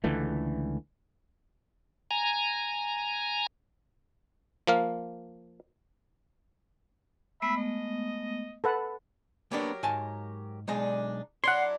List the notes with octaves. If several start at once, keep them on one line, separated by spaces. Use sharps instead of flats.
C#2 D3 E3 A3
G#5 A#5
F3 A#3 F5
G#3 A3 B3 E5 B5
D#5
A4 B4 F#5
F#3 A#3 B3 D4 G4 A#4
G#2 G#5 A5
B1 G#3 D4 D#4 D#5
F#3 D4 E4 C#5 F#5 C6